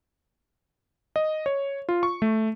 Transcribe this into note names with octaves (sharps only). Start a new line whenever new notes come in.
D#5
C#5
F4
C#6
A3